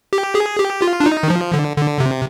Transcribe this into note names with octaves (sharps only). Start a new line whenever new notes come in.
G4
G#4
G4
F4
D4
D#4
D#3
F3
D3
D3
C3